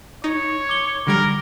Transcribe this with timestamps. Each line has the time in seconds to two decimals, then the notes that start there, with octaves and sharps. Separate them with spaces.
0.24 D#4 C#5
0.69 D6 G7
1.07 D3 G3 A#4 G#6